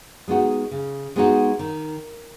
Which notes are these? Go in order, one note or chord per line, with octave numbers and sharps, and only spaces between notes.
G#3 B3 D#4 F#4
C#3
G#3 B3 D#4 F#4
D#3